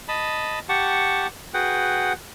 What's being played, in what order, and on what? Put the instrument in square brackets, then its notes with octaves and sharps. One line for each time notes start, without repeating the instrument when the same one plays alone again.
[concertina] D#5 A5 B5
G4 F#5 A5 C#6
F#4 G#4 B4 F#5 G5